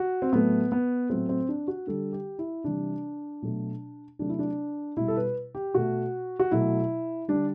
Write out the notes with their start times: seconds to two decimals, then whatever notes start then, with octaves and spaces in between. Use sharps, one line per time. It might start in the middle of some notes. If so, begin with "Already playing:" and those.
Already playing: F#4
0.22 C4
0.32 A2 F#3 A3 B3
0.72 B3
1.10 A2 F#3 A3 C4
1.29 C4
1.49 D4
1.68 F#4
1.87 D3 G3 A4
2.13 G4
2.39 E4
2.64 C3 E3 G3 D4
3.42 B2 F#3 A3
4.19 C3 F#3 A3 D4
4.29 E4
4.39 D4
4.96 B2 G3 E4
5.08 A4
5.16 B4
5.55 G4
5.74 B2 A3 F#4
6.39 F#4
6.51 B2 F#3 A3 E4
7.28 D3 G3 D4